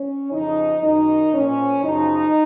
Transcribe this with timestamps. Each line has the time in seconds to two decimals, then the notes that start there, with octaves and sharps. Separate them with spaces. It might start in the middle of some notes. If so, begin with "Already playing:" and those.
Already playing: C#4
0.31 F2 C#3 F3 D#4
0.82 F#2 D#3 D#4
1.32 A#2 F3 C#4
1.83 F#2 C#3 F3 D#4